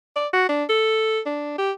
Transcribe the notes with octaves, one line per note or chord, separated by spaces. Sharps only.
D5
F#4
D4
A4
D4
G4